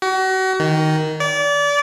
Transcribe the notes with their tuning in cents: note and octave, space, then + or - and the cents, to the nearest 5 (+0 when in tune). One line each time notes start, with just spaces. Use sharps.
F#4 +35
D#3 +5
D5 -30